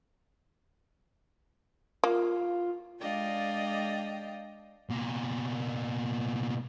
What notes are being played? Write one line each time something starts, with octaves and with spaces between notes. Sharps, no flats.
A#3 F4
G#3 D4 D5 D#5 F5 G5
B2 A#3